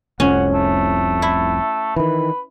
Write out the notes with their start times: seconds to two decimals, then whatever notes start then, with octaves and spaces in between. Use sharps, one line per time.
0.20 F1 C2 F2 C#4 F#5
0.53 A3
1.22 E4
1.96 D#3 E3 B4